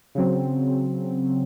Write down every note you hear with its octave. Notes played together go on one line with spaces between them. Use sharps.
C#3 F#3 C4